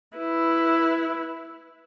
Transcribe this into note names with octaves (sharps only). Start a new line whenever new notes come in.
E4 B4